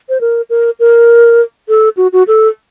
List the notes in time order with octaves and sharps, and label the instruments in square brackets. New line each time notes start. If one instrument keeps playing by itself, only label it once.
[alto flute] C5
A#4
A#4
A#4
A4
F#4
F#4
A4